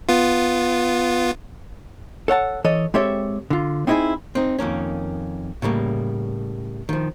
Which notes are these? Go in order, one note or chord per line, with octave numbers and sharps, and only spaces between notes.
B3 F4
A4 C#5 F#5 A5
E3 A4 C#5 D#5
G#3 C4 G4 A4 C#5 E5
D3 F4
C4 D#4 E4 G4 G#4
C4 D#4
F2 D#3 A#3 C#4
A2 C#3 G3 A#3
D#3 F3